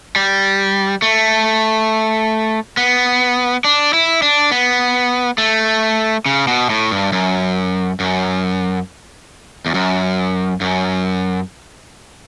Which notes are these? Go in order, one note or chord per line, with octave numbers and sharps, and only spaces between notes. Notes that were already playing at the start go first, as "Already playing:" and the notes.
G3
A3
B3
D4
E4
D4
B3
A3
C#3
B2
A2
G2
F#2
F#2
E2
F#2
F#2